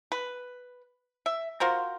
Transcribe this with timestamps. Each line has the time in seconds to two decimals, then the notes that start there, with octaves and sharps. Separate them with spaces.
0.12 B4
1.26 E5
1.60 F4 F#4 A#4 C5